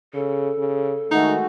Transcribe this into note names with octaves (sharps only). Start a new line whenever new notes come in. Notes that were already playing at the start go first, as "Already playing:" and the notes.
C#3 A4
C#3
D#3 G#3 A3 D#4 F#4